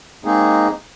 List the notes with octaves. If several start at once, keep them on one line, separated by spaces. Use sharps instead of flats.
G#3 A#3 C4 D#4 G#4